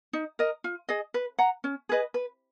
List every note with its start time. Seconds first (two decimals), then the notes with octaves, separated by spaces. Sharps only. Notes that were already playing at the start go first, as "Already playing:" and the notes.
0.13 D#4
0.39 A#4 D#5
0.64 F4
0.89 G#4 D#5
1.14 B4
1.38 F#5 A#5
1.64 C#4
1.89 G#4 B4 D#5
2.14 B4